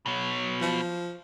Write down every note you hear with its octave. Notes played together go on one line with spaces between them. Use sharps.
B2 F#3
F3